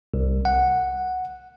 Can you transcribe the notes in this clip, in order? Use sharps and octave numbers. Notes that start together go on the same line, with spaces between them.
C2
F#5